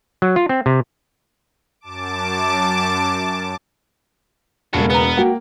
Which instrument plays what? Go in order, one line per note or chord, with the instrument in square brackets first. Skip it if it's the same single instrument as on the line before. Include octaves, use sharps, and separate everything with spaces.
[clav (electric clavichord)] F#3
F4
C4
C3
[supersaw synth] F#2 A5 D6
[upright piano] E1 [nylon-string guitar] C#3 A#3 [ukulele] F4 [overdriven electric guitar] F#4 A4
[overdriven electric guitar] B3 [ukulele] B4 G#5 A#5
[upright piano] A#3 [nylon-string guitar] F#4 G5